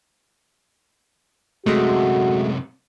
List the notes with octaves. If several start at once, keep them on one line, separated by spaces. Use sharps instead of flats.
F#2 C3 G#3 A3 F#4